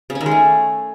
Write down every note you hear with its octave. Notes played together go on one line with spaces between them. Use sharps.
C#3
C#4
D#3
G#3
A3